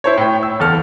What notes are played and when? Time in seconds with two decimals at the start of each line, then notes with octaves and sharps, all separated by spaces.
0.04 E4 C5 C#5
0.17 A2 G5
0.43 E6
0.59 F#1 E2 A4 F6